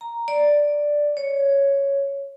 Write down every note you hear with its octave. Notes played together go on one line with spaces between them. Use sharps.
A#5
D5
C#5